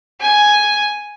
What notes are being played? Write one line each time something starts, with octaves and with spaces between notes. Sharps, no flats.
G#5